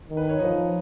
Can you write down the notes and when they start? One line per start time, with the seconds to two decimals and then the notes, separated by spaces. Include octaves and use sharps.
0.09 D#3
0.17 B4
0.29 C#5
0.39 F3 D#4 D#5